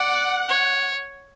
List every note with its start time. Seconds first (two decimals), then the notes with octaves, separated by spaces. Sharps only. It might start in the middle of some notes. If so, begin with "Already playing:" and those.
Already playing: D5 F#5
0.49 C#5